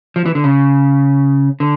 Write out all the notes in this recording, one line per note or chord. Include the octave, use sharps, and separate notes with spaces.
F3
E3
D3
C#3
D3